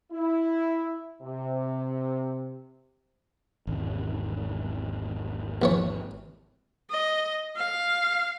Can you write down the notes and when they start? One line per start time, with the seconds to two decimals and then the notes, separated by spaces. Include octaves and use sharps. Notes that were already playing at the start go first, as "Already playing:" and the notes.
0.12 E4
1.22 C3
3.67 G#1 E2 C#3
5.62 A#1 E3 C#5
6.90 D#5
7.56 F5